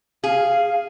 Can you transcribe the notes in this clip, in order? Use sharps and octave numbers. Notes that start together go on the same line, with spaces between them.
G#4 F5